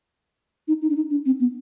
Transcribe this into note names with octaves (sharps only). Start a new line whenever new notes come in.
D#4
D#4
D4
D#4
D4
C4
B3